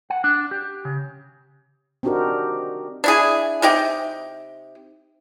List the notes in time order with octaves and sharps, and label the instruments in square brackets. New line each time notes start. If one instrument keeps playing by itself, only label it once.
[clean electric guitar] F#5
D4
G4
C#3
[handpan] C4 D4 D#4 F#4 G4 A#4
[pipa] D4 E4 G#4
C3 D#4 G4 G5